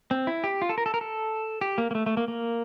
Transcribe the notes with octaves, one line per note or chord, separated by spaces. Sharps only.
C4
E4
G4
F4
A4
A#4
A4
A#4
A4
G4
A#3
A#3
A3
A3
A#3
A#3